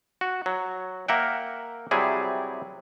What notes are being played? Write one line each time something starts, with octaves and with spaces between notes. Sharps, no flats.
F#4
F#3
A#3 A#4 E5 F#5 G5
C3 F#3 G3 E4 G#4